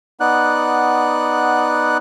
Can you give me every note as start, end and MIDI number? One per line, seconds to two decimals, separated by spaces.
0.20 1.97 59
0.20 1.97 63
0.20 1.97 74
0.20 1.97 78
0.20 1.97 90